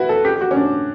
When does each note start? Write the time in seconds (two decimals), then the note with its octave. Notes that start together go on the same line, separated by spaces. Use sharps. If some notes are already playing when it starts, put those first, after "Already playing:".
Already playing: E4 F#4 B4
0.09 A4
0.25 G4
0.36 G4
0.41 F#4
0.51 C#4
0.56 D4